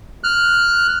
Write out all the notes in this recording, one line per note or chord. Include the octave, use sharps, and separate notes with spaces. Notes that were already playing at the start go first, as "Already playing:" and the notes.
F6 F#6